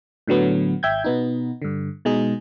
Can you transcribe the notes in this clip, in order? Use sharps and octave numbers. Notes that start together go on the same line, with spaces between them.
A2 D3 F#3 B3
G#1 E5 G5 G6 G#6
B2 B3 D#4
G2 D3
B2 G#3 D#4 G#4